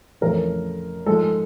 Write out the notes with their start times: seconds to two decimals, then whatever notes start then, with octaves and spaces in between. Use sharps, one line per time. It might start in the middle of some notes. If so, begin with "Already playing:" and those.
0.21 F2 C#3 E3 A3 A#4
1.06 G#2 F3 G#3 A4